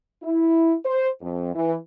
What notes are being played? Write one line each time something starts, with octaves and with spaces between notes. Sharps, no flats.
E4
C5
F2
E3